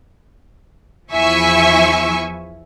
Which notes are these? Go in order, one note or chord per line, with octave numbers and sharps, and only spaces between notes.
E2 F3 E4 E5 G#5 C#6